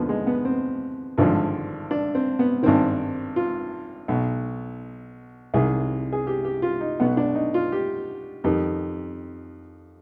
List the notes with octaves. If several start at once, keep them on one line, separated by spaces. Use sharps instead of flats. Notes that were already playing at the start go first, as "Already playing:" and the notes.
Already playing: D#2 D3 F3 B3
G#3
B3
C4
G#1 G2 D3 F3
D4
C4
B3
G#1 G2 D#3 C4
F4
B1 B2
C2 C3 D#3 G#4
G#4
G4
G4
F4
D#4
B1 B2 B3
D4
D#4
F4
G4
F2 D#3 G4